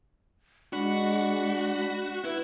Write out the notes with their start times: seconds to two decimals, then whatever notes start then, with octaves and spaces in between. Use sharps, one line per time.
0.73 G#3 D4 F#4 F#5 B5
2.24 E4 B4